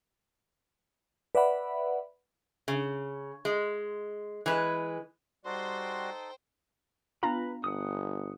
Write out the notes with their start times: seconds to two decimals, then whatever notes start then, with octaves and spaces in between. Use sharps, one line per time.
1.35 B4 D5 E5 F#5 B5
2.68 C#3
3.45 G#3
4.46 E3 G#3 B4
5.45 G3 D#4 F#4 A4 C5 D5 G5 C6
7.23 B3 D4 F4 B4 F5 A#5 B5
7.64 G1 F#5 D#6